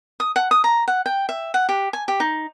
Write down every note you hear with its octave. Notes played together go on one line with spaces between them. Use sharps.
D#6
F#5
D#6
A#5
F#5
G5
E5
F#5
G4
G#5
G4
D#4